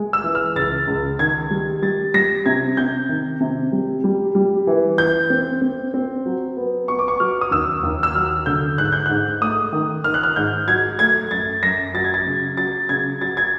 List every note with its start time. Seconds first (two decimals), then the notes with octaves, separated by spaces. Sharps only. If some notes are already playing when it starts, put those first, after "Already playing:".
Already playing: G#3
0.13 E6
0.24 E3
0.35 F6
0.56 C#2 A6
0.87 C#2
1.19 D#3 G#6
1.51 G3
1.82 G3 A6
2.14 G3 A#6
2.46 C3 G#6
2.77 C3 G6
3.09 D#3
3.41 C3
3.72 G3
4.04 G3
4.35 G3
4.67 E3
4.98 E3 G6
5.30 C4
5.62 C4
5.94 C4
6.26 F#3
6.57 B3
6.88 B3 C#6
6.99 D6
7.08 C#6
7.20 F#3 F6
7.41 D#6
7.51 D#2 E6
7.83 D#2
8.03 E6
8.15 F#3 F6
8.46 D3 G6
8.78 G#2 F#6
8.92 G6
9.06 G#2 F#6
9.41 A3 D#6
9.73 D#3
10.04 D#3 F6
10.14 F#6
10.23 F6
10.36 G#2 G6
10.67 F#3 G#6
10.99 A3 G#6
11.31 F#2 A6
11.63 F#2 A#6
11.94 F#3 A6
12.04 G#6
12.14 A6
12.26 C#3
12.57 F#3 A6
12.89 C#3 G#6
13.21 F#3 A6
13.37 G#6